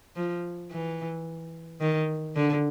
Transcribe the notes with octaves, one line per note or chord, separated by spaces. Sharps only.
F3
E3
D#3
D3